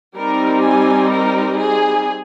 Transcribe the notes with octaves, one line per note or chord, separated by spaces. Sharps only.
G3 C4 D#4 A#4
G#5
A#4
G#4